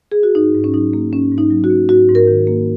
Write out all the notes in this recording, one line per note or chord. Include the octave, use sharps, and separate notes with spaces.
G#4
F#4
G#2 D#4
G#2
C#4
F#3 D#4
A#3
G#2 C#4
G#2
D#4
F#3
F#4
A#3
G#2 F#4
G#2
A#4
D#3
A#3